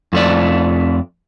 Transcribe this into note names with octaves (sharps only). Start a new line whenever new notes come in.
F2 A3 D5